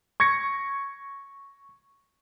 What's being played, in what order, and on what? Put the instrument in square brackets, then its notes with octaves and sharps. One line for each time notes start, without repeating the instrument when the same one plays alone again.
[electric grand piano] C#6 G#6 A#6 C#7